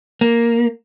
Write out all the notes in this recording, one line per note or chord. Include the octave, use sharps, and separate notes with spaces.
A#3